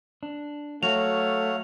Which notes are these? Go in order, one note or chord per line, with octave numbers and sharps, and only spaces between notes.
D4
F#3 A3 C#5 F5 F#5 F7